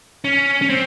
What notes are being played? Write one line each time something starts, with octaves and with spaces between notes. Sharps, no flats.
C#4
C#4
C4